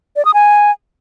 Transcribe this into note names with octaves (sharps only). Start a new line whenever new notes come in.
D5
D#6
G#5